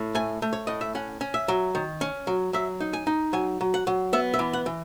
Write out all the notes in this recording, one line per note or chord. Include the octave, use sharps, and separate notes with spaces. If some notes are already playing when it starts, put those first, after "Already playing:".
Already playing: A2
A3 G#5
A3
C#5
A2 D#5
E5
C#4 F#5
C#4
E5
F#3
D#3
C#4
F#3
F#3 E5
D#4
G#5
D#4
F#3 G#5
F#3
F#5
F#3
B3 E5
E5
E3
F#5
E3